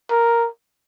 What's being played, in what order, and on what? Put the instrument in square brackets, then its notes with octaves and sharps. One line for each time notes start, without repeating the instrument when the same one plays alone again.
[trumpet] A#4